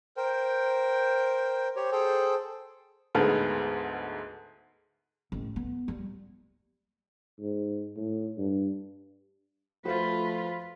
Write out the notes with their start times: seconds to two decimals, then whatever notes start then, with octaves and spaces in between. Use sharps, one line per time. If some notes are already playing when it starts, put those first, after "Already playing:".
0.17 A#4 C5 G5
1.76 G4 C5 C#5
1.92 G#4 A4 C5 G5
3.15 D2 G#2 G#3 B3 A4 F6
5.32 A1
5.56 B3
5.88 G3
7.40 G#2
7.97 A2
8.38 G2
9.85 F3 A3 F4 F#4 B4 C5